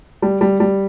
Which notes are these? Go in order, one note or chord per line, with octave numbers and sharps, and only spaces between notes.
G3
G3
G3